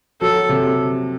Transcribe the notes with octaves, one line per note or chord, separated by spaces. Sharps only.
F#3 A4
C3